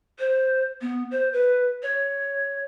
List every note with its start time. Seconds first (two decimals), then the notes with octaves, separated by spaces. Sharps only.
0.19 C5
0.81 B3
1.11 C5
1.33 B4
1.83 C#5